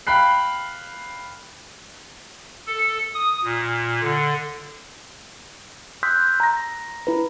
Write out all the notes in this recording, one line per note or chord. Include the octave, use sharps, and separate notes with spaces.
F5 G5 B5 F#6 C7
A4
D#6
A#2
D3
C6 D#6 E6 F#6 G6 B6
A#5 A#6
E4 B4